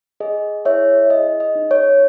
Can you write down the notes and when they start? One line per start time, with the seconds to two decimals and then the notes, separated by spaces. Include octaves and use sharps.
0.20 G#4 D#5
0.65 E4 C#5 E5
1.10 G#4 D#5
1.40 D#5
1.55 D#4
1.71 C#5